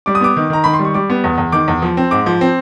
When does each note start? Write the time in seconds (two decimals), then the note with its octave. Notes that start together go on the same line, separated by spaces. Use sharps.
0.06 G3 D6
0.15 D#6
0.21 B3 D6
0.36 D#3
0.50 D#3 A#5
0.64 D#3 B5
0.73 C6
0.79 G3
0.85 C#6
0.94 G3 D6
1.10 B3
1.24 E2
1.38 E2
1.52 D#3 D6
1.68 E2
1.82 F3
1.97 C4
2.11 G#2 D6
2.26 F3
2.41 C4